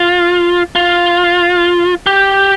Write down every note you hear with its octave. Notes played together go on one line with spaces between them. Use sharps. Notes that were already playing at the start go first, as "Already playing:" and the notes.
Already playing: F4
F4
G4